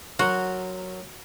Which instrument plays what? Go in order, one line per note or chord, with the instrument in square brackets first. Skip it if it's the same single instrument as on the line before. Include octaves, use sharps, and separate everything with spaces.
[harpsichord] F#3 A#4 C6 [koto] F#4